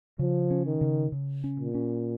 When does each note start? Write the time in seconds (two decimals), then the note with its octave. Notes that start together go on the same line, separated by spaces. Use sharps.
0.19 C#3 F3
0.51 C#4
0.66 D#3
0.81 C#3
1.12 C#3
1.44 C#4
1.59 A#2
1.75 C#4